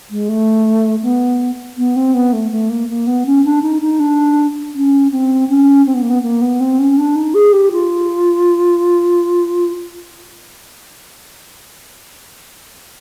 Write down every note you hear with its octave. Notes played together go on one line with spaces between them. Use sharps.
G#3
A3
B3
B3
C4
B3
A3
A3
A#3
A#3
B3
C#4
D4
D#4
D#4
D4
C#4
C4
C#4
C4
B3
A#3
B3
A#3
B3
C4
C#4
D4
D#4
G#4
G4
F4